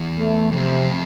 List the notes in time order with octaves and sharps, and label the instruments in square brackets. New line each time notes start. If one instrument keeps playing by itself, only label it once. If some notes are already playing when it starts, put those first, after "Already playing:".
Already playing: [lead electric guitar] E2
[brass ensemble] A3
[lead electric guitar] F2 [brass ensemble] C3